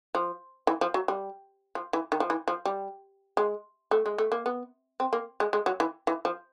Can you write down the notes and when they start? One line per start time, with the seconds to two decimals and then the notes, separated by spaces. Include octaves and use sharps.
0.15 F3
0.67 E3
0.81 F3
0.94 F#3
1.08 G3
1.75 F3
1.93 E3
2.12 D#3
2.20 F3
2.30 E3
2.48 F3
2.66 G3
3.37 G#3
3.91 A3
4.06 G#3
4.18 A3
4.32 A#3
4.46 B3
5.00 C4
5.13 A#3
5.40 G#3
5.53 G#3
5.66 F#3
5.80 E3
6.07 E3
6.25 F3